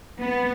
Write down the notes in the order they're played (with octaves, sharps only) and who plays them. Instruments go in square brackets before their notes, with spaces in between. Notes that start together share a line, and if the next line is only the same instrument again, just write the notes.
[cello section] B3